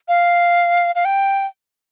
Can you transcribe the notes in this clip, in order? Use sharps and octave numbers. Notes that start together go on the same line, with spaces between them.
F5
F5
G5